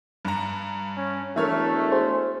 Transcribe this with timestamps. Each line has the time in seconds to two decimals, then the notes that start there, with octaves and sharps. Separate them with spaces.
0.25 G2 A#5
0.97 C#4
1.36 E1 E3 A3 A#4 C#5 E5 F6
1.92 G#4 C5